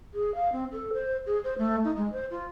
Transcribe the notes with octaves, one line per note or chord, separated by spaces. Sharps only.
G#4
F5
C4
A4
C5
G#4
C5
A3
D#4
G#3
C5
F4